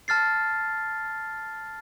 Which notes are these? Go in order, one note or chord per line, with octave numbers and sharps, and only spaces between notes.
A5 F6 A6 C7